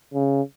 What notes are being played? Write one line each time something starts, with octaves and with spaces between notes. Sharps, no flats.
C#3